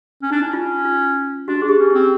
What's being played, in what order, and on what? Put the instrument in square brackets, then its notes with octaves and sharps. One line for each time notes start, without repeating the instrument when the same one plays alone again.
[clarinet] C#4
[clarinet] D4 [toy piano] D#4
[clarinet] C#4 [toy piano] E4
[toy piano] F4
F4
[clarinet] D4 [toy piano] F#4
[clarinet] D4 [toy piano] G#4
[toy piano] G4
[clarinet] C#4
[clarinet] C4 [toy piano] G4